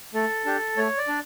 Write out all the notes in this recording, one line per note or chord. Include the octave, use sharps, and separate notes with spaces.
A3 A4
D4 G4
A3 C#5
D5
D4